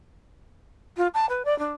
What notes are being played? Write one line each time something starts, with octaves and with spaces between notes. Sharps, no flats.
F4
A5
B4
D5
D4